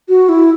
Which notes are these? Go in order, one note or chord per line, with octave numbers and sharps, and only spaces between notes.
F#4
E4